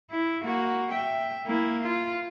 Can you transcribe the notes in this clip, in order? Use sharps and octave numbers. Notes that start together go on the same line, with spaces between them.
E4
A#3 F#4
E5 G5
A#3 E4
F4